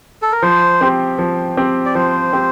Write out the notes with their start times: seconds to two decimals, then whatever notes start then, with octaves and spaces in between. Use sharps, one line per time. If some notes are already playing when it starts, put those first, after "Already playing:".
0.22 A4
0.32 A#4
0.42 F3 C5
0.81 C4 G4
1.19 F3
1.57 C4 G4
1.86 D5
1.95 F3 C5
2.33 C4 G4